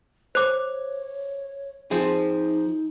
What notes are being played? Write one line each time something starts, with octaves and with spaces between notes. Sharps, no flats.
C5 C#5 D6
F3 C4 D#4 G#4